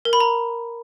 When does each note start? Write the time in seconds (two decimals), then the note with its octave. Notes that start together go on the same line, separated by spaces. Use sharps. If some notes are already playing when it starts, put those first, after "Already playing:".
0.05 A#4
0.13 B5
0.20 A#5